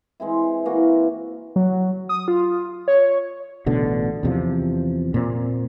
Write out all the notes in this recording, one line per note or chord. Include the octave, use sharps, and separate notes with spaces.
E3 G#3 C4 E4
E3 A#3 F#4
F#3
D#6
F4
C#5
A1 B2 D3
E2 C3 F3
A#2 C4